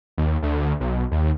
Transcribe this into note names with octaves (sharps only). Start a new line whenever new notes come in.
D#2
D2
B1
D#2